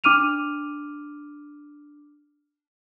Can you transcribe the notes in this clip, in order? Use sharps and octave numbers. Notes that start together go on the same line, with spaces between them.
D4 D6 F6 D#7 F7